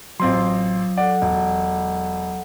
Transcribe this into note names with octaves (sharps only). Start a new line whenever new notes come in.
A1 F#3 C4 F4 C6
A4 D5 F#5
E1